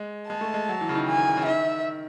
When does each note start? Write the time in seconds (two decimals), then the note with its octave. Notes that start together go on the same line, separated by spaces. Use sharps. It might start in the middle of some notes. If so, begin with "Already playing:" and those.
Already playing: G#3
0.29 G#3 A5
0.41 A3
0.54 G#3
0.69 F#3
0.81 E3
0.89 C#3
0.95 D#3
1.07 G#5
1.37 C#3
1.46 D#3 E5